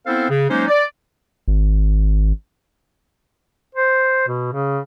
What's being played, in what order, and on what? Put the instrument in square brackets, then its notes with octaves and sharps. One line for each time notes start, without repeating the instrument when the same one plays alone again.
[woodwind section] B3 C4 E4 A4 C5 F5
C#3
F#3 G#3 A#3 C#4 D#4 C5
D5
[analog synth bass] G#1
[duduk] C5
B2
C#3